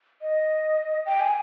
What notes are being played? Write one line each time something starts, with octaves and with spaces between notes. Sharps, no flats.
D#5
G5
G#5